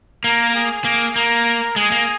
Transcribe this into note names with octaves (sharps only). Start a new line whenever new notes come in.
A#3 A#4
G#4
A#3
A#3 A#4
G#3 G#4
A#3